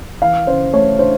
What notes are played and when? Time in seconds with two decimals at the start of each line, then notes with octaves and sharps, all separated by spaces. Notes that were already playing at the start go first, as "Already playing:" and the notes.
0.22 E3 F5
0.47 C#3 C5
0.73 A3 C#5
0.99 D4 C5